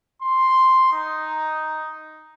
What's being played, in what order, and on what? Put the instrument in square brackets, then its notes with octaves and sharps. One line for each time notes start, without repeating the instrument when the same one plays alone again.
[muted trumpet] C6
D#4